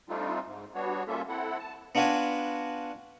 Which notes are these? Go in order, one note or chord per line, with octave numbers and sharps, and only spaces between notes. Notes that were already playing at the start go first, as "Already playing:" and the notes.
G3 A3 C4 D4 D#4 F4
G#2
G3 B3 D4 F#4 C#5
G3 A#3 C#4 F4 A4 E5
C4 E4 A4 F#5
A5
B3 D4 F4 F#4 B4 G#5